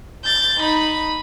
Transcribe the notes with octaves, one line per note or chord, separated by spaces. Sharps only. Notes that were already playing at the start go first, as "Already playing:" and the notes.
G6 A6
D#4 B5